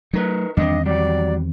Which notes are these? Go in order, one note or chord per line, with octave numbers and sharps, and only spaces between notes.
F#3 A3 D#4 A#4 B4
E2 D#3 G3 C4 D4 D#5
F#3 G3 G4 D5